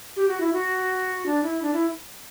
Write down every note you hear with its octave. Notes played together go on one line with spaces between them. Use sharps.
G4
F#4
E4
F#4
D4
E4
D4
E4